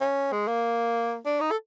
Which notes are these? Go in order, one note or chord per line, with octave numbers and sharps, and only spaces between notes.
C#4
G#3
A#3
D4
D#4
A4